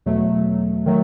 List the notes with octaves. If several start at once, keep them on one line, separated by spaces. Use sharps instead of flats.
E2 B2 F#3 A3
D#3 F#3 A3